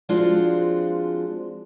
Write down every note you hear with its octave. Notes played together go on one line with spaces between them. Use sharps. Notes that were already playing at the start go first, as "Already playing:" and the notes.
F3 G#3 C4 D4 F4 F#4